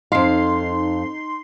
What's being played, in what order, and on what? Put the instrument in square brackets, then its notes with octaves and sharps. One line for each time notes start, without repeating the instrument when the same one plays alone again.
[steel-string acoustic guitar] F2 F5 [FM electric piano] D#4 C6 C7